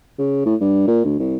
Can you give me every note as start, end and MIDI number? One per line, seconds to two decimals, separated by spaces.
0.18 0.42 49
0.45 0.55 45
0.60 0.82 43
0.87 1.00 46
1.04 1.15 38
1.19 1.37 36